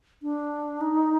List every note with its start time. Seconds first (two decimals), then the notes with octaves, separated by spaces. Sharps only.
0.23 D4
0.81 D#4